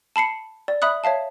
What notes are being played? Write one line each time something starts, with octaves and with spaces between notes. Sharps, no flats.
A5 B5 C7 C#7
D5
E5 B5 D#6 F#6
C#5 E5 F5 A5